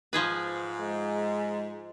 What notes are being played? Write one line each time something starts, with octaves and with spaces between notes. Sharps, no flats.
G#2 F3 G#4 B4
G#3